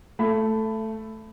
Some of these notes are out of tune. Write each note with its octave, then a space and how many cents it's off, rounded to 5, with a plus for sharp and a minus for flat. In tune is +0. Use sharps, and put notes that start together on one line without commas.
A3 +0 E5 +35 B5 +15